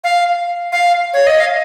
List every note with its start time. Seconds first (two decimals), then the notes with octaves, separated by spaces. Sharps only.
0.04 F5
0.72 F5
1.13 C#5
1.27 D#5
1.40 F5